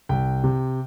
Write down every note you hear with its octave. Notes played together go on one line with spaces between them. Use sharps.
C2 G5
C3